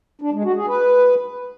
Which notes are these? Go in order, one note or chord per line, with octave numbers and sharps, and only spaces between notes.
D4
G#3
F#4
G#4
B4